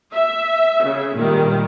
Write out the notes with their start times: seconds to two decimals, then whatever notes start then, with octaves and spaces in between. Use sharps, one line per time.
0.12 E5
0.83 C#3
1.15 A#2 D#3 G3